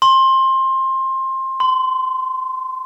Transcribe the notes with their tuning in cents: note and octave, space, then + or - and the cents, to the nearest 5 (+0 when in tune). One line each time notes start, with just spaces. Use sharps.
C6 +20
C6 -25